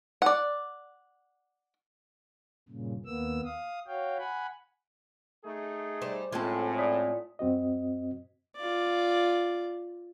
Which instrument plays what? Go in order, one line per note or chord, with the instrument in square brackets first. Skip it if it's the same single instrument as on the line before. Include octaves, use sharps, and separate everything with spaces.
[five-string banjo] D5 F#5
[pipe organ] G2 A#2 C#3
D#2 A#3 B3 E6
F5 D#6
F#4 C#5 F5 G5
F#5 G#5 B5
[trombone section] A3 D#4 G#4
[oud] G3 C5
[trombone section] A2 [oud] G#3 C4 C#4 [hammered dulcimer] F4 A4
[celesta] D5 D#6 B6
[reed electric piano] F#2 C4 F#4 D#5
[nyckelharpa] F4 D5